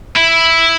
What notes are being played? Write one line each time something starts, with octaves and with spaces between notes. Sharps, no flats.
E4